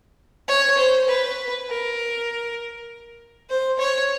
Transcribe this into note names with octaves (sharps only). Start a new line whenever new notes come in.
C#5
C5
B4
A#4
C5
C#5